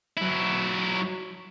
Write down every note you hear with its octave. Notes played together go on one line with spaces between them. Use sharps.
F#3 E4